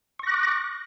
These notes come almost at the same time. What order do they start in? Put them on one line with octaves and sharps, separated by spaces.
C#6 A#6 F#6 D6